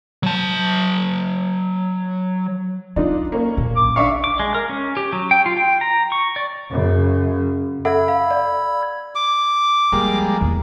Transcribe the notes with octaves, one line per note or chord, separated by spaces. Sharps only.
F#3 A5
F#3 D4 D#4 F4
A#3 C#4
A#1 F#3
D6
D4 E5 F5 C#6
D6
G#3
A#4
C#4
G4
F#3
G5
F4
G5
A#5
C#6
D5
F#2 C#3
A4 E5 F#5 B5 E6 G#6
F5
D5
D6
F3 G3 G#3 A#3
E2